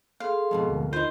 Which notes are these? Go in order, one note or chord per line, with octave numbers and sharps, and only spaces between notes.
G#4 A4 F5 C6
F2 G#2 B2
D2 A#4
D#4 F4 C5